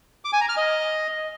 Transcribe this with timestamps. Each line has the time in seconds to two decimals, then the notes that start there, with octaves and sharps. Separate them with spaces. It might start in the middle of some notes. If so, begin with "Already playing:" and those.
0.25 D6
0.33 G#5
0.41 A#5
0.49 F6
0.57 D#5